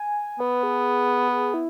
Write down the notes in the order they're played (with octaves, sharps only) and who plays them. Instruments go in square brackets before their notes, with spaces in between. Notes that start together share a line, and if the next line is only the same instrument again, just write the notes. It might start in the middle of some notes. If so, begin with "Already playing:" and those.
Already playing: [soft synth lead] G#5
[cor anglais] B3 [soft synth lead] B4
[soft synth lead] G#4
G#4
E4